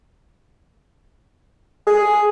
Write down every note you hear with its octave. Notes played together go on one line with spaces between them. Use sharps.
G#4